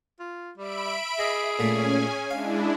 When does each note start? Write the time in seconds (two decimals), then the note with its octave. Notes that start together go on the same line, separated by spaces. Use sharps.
0.20 F4
0.58 G3 E5 B5 D7
1.19 G#4 D#5
1.59 A#2 A3 C#4 G#5
2.31 G#3 D4 E4 F5